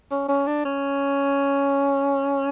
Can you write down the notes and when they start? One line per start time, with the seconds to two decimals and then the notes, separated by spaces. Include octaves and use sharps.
0.11 C#4
0.29 C#4
0.47 D4
0.65 C#4